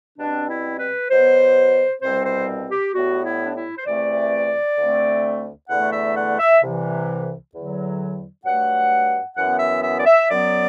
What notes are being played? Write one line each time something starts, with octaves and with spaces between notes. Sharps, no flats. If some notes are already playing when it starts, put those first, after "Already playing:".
B2 G3 C4 D4
E4
B4
B2 F#3 B3 C5
C2 B2 G3 C4 C5
C5
G4
A2 G3 B3 F#4
E4
D4
E4
C5
E2 C3 E3 A3 C4 D5
D2 D3 A3 C4
E2 D3 A3 F#5
E5
F#5
E5
C2 C3 E3
E2 D3 F#3
G2 F#3 A3 F#5
F#2 E3 B3 F#5
E5
E5
D5
E5
F#2 F#3 B3 D5